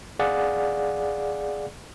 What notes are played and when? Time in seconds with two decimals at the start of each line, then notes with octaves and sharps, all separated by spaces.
0.19 G#4 D5 F5 F#5